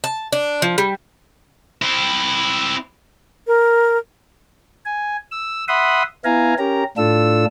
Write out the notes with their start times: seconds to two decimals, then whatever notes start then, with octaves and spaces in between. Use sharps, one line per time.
0.04 A5
0.33 D4
0.62 F3
0.78 G3
1.82 C4 E4
3.47 A#4
4.85 G#5
5.31 E6
5.68 E5 F#5 B5 C6 D#6
6.25 B3 E4 F5 G#5 A#5
6.59 C#4 G4 A#4 A#5
6.97 A2 D4 F4 A4 E6